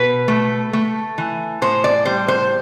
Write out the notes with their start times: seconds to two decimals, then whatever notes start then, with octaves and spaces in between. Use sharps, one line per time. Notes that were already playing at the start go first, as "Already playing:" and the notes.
Already playing: B2 B4
0.28 A3
0.73 A3
1.18 E3
1.62 A2 C5
1.84 D5
2.05 G3 C5
2.28 C5